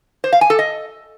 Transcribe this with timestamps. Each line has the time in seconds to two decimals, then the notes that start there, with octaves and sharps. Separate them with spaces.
0.24 C5
0.33 F5
0.41 G#5
0.50 A4
0.59 D#5